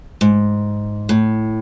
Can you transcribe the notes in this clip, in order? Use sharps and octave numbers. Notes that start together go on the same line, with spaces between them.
G#2
A2